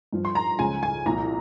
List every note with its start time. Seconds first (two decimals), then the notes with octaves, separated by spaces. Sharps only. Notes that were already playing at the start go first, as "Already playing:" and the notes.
0.13 G2 F3
0.25 C6
0.35 A#5
0.59 C#2 C#3 F3 G#5
0.83 G#5
1.06 C2 A#2 F3 A#5